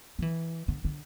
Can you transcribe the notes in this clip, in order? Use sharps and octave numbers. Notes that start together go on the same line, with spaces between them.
F3
E3
D3
D3